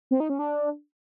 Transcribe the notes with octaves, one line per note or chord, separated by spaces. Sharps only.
C4
D#4
C#4
D4